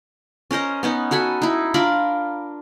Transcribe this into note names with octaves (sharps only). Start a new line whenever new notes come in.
C#4 A#4 C5 D#5
B3 C#4 D#4
F#4 A4 G#5 B5
D#4 E4
D4 F4 A#4 B5